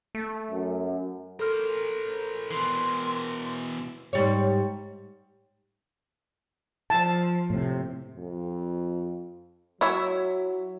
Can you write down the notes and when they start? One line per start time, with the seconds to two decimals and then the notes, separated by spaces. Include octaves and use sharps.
0.15 A3
0.51 F#2
1.40 A4 A#4 C5 F6
2.51 B2 E3 C6 C7
4.13 G#2 G3 C#5
6.90 F3 A5
7.50 A2 C3
8.16 F2
9.81 F#3 E4 C#5 E5